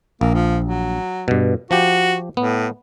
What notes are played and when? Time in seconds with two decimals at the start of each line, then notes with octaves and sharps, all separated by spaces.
0.21 A#1 A#3
0.34 F3
0.65 F#3
1.28 G2 B2
1.71 F3 F#4 G4
2.37 A2 B3